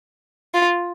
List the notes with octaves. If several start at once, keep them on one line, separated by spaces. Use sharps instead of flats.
F4